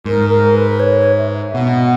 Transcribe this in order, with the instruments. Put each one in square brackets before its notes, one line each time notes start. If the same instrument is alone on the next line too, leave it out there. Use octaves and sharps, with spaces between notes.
[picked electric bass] G#2 [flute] A#4
[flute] A#4
B4
C#5
E5
[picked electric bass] B2 [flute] F#5